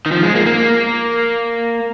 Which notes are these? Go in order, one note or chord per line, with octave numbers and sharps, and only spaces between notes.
D#3
F3
G#3
A#3
A#3